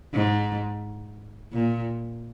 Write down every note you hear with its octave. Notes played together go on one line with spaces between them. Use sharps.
G#2
A#2